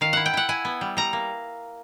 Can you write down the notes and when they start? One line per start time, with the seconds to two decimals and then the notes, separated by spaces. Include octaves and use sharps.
0.01 D#3 F5
0.13 E4 F#5
0.26 G5
0.33 E4 F#5
0.49 E4 G#5
0.65 B3
0.81 G3
0.97 G3 A#5
1.13 A#3